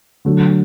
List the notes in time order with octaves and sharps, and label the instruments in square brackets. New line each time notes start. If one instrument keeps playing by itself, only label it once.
[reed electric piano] D3 A3 D4 [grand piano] F#3